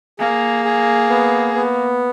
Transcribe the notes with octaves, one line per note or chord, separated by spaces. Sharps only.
A#3 G#4
G#4
B3
B3